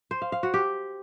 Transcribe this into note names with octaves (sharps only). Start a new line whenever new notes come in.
C5
F5
F5
F#4
G4